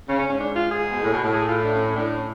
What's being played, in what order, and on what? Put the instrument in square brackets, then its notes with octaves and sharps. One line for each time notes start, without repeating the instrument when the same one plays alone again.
[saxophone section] C#3 [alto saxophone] C#4
[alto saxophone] C#4
[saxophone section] G#2 [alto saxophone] C#4
[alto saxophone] D4
F4
G#4
[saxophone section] B2
A2
B2
A2
[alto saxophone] G#4
F4
D4
C#4
C#4
[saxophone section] A2 [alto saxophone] D4
[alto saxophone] C#4